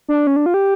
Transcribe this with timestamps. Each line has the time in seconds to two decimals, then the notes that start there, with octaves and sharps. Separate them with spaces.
0.08 D4
0.27 C#4
0.36 D4
0.46 F4
0.54 G4